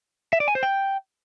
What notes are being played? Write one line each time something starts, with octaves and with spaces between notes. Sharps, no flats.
E5
D5
G#5
C5
G5